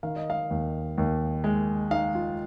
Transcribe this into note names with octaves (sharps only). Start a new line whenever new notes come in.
D#3 F5
D#5
F5
D#2
D#2
G#3
D#4 F5
F4